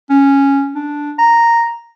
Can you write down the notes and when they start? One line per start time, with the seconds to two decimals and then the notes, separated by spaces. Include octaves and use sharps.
0.10 C#4
0.75 D4
1.19 A#5